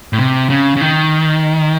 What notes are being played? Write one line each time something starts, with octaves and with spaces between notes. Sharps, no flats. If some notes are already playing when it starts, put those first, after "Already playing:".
A2
C3
C#3
C#3
D#3